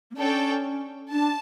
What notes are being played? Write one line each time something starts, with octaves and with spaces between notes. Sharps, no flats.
A#3
C#4 D4 A4 C#5 G5
D4 A5